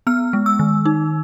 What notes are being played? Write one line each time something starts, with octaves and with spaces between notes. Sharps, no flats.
B3 F6
G#3
E6
D#3
D#4